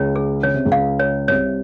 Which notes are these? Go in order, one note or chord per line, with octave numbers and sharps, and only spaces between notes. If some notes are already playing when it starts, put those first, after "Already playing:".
Already playing: C#2 C#3 C#5
G#4
C#3 C#5
C3
C#2 C#3
F5
C#5
C2 C3 C#5